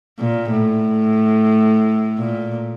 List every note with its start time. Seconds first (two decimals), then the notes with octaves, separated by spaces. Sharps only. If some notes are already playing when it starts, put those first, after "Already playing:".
0.20 A#2
0.52 A2
2.18 A#2